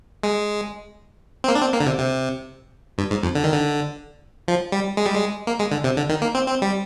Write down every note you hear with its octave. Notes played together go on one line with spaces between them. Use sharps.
G#3
C4
A#3
D4
C4
A#3
D3
C3
C3
G2
G#2
F2
D3
D#3
D3
F3
G3
G#3
G3
G#3
A#3
G#3
D3
C3
D3
D#3
A#3
C4
C4
G3